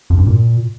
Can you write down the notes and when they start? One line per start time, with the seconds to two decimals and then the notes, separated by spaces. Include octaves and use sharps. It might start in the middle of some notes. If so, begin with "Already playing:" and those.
0.10 F2
0.18 G2
0.27 A#2